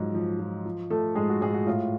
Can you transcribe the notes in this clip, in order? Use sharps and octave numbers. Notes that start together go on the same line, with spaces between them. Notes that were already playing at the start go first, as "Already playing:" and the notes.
Already playing: G#2 F3 F#3
F3
F3
F3
F3 A3 A4
G#2 G#3 G#4
F#4
G#2 G#3 G#4
F#4
A2 F4